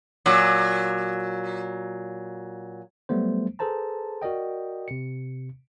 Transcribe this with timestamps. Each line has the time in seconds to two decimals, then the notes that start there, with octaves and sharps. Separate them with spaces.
0.26 A#2 F#3
3.09 F#3 G3 A3 B3 C5
3.59 G#4 A4 B4 C5 A5 A#5
4.22 F#4 A#4 D5 D#5 G5
4.88 C3 C#7